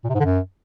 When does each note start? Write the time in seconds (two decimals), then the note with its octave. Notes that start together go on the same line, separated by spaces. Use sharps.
0.04 A#2
0.09 C3
0.14 G#2
0.20 D3
0.25 F#2